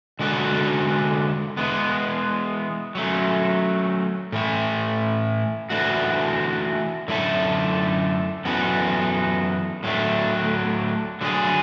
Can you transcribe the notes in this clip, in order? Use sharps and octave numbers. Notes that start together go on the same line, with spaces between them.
D3 G#3 D4 F#4 A4
E3 G#3 B3
F#3 A3 C#4
A2 E3 A3 E4
E3 A3 D4 F#4
F#2 D3 A3 E4 A4
F#2 E3 B3 F#4 A4
A2 F#3 A3 D4
D3 F#3 A3 D4 G#4